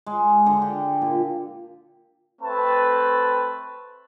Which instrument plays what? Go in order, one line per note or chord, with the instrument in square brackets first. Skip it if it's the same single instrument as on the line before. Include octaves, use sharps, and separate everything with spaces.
[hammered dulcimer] G#3
D3
G4
A#2
[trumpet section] A3 C4 B4 A5